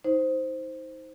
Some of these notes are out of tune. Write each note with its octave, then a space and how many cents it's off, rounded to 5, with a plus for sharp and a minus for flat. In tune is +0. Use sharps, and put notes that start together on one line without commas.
D#4 +30 C5 +0